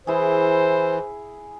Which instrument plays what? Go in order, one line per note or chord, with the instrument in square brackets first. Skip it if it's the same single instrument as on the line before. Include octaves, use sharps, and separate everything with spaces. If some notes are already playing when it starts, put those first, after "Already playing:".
[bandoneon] E3 [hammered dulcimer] E4 G#4 [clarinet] C5